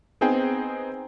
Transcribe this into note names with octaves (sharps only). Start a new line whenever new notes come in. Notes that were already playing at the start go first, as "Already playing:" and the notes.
B3 C4 D#4 G#4 C5 G5